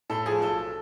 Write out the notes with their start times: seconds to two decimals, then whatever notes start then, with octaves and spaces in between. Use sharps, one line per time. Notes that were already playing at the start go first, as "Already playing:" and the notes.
0.10 A2 A4
0.26 F3 G#4
0.42 B1 A4